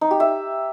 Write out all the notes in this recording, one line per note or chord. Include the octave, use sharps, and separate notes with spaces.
D#4
G4
E5